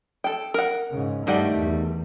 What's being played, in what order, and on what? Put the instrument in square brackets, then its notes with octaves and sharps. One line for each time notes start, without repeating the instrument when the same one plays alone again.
[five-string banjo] A4 G5
A#4 F#5
[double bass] G#2 C#3
[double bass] G2 A3 [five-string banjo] D#3 G3 F#5
[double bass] E2